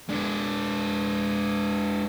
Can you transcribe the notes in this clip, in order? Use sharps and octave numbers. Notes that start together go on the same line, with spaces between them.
G#3 D4